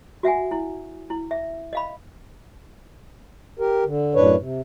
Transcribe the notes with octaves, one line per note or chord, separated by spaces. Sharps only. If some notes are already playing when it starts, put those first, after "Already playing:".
F#4 E5 F#5 G#5
E4
E4
E5
D#5 F5 B5
G4 A#4
D3
F#2 A2 D4 B4 C#5
C3